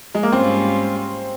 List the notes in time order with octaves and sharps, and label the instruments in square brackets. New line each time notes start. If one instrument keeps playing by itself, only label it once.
[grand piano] G#3
A#3
[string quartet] G#2 G3 C#4 F4 [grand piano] C4